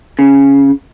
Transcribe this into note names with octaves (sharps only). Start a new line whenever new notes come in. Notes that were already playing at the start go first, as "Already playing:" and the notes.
C#3